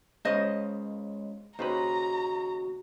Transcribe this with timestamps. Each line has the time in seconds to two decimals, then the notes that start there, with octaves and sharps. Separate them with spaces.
0.25 C#2 C#3 G#3 C5 D#5
1.59 D#2 C#3 F#4 B4 C5 A#5